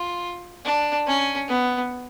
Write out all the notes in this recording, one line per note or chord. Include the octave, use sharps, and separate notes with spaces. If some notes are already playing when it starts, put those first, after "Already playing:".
Already playing: F4
D4
C#4
B3